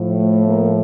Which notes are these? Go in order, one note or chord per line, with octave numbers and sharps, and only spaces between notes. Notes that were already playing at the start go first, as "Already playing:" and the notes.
Already playing: A2 F3
A3
A#3